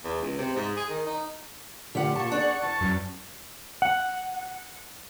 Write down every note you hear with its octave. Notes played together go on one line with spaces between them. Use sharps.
E2
C#2
C3
G#2
G#4
D#3
D#4
A2 D3 F3 G4 F#5
A#2 A5 C#6
D4 G#4 F#5
E2 A5
F#2
F#5